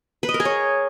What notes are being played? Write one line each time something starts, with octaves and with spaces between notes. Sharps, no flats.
B4
D#5
A#4
G#4
C#5